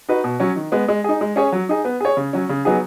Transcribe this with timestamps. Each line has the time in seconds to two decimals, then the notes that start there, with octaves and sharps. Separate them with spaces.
0.08 D#4 F#4 B4
0.24 B2
0.40 F#3 C#4
0.56 D#3
0.72 G#3 B3
0.88 G#3
1.04 D#4 G#4
1.21 G#3
1.36 C#4 G#4 C#5
1.52 F#3
1.69 D#4 G#4
1.85 B3
2.00 G#4 C#5
2.17 C#3
2.33 F#3 C#4
2.49 C#3
2.65 F#3 B3 D#4 G#4